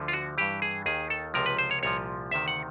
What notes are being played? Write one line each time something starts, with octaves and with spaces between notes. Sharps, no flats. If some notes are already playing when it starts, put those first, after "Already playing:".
Already playing: D2 D3 F3
F4
F#4
G2 E3 G4
G#4
D#2 D#3 G#4
A4
C#2 C3 F3 A#4
B4
C5
C#5
C2 A#2 F3 C#5
D2 C3 D#3 E5
F#5